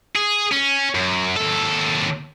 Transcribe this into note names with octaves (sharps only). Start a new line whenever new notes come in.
G#4
C#4
F#2
D#2 A4